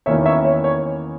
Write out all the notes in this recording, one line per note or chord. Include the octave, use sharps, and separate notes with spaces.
E2 D#3 A#3 C#4 E4 C#5 E5
C#5 E5
C#5
C#5